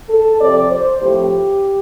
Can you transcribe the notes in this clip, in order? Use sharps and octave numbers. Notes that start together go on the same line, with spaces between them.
A4
C3 F3 C4 D5
C5
A2 F3 C4 G4